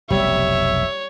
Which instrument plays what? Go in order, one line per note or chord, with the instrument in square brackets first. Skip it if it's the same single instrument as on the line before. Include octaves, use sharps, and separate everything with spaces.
[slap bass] F1 B1 [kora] G3 [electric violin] C#5 [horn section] E5